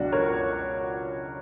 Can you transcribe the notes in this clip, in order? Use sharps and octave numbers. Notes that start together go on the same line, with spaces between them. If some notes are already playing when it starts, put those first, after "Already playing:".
Already playing: C#2 B2 F#3 D4 F#4
A#4 C#5